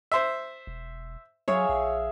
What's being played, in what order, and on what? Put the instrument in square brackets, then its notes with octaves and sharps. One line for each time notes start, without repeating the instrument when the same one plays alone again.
[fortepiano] C5 E5
[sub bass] E1
[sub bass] F#3 [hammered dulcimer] G#4 E5 F5 [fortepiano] C#5
[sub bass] A#1